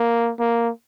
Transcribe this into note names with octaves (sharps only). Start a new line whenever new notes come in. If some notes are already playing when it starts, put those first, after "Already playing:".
Already playing: A#3
A#3